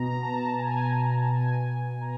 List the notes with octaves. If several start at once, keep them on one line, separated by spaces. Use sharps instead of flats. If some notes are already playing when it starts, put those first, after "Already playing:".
Already playing: B2 A#5
A#5
A5
G#5
B2 G#5
A#5